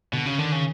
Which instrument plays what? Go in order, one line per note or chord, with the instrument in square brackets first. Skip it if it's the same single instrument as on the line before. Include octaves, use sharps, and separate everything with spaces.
[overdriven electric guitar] B2 [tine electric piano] D3
[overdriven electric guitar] C#3
[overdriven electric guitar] D3 [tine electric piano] D#3
[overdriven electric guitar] C#3